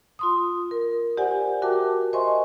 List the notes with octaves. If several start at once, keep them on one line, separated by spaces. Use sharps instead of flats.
F4 C6 D#6
A#4
G4 C5 D5 F#5 G#5
F#4 A#4 E5 G5 A5 D6
C5 D#5 E5 G#5 C6 C#6